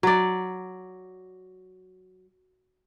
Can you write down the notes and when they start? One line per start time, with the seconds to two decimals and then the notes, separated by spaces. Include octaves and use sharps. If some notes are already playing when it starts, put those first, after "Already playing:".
0.03 F#3 D5